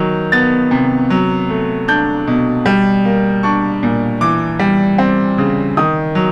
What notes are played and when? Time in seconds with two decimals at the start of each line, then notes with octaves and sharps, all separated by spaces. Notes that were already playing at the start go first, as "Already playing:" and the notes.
Already playing: D#3 F#3
0.32 B3 A6
0.71 C3
1.10 F#3
1.49 A3
1.88 D4 G6
2.27 B2
2.66 G3
3.05 A#3
3.43 D4 C#6
3.83 A#2
4.21 E3 D6
4.59 G3
4.98 C4
5.38 C#3
5.77 D#3 D#6
6.15 F#3